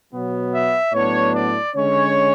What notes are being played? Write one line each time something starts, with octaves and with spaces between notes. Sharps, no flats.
B2 F#3 B3
E5
A2 F#3 B3 D4 C#5
D5
D3 G#3 C#4 C#5